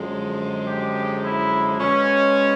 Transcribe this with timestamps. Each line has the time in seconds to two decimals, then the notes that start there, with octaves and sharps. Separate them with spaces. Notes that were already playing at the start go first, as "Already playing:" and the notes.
Already playing: F#2 D3 F3 G#3
0.67 G4
1.23 E4
1.78 B2 G#3 C#4